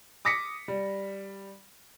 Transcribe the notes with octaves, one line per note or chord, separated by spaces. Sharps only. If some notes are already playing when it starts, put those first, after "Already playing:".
D6 D#6 A#6 B6 C#7
G3